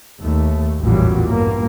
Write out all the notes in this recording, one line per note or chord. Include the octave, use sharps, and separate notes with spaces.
D#2 A3
A1 E2 G2 A#2 F#3 G3
G2 A#3